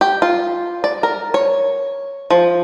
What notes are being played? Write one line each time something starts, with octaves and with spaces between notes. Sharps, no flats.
G4
F4
D5
A#4
C#5
F3